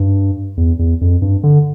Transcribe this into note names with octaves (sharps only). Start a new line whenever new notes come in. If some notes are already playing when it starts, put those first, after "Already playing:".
Already playing: G2
E2
E2
F2
G2
D3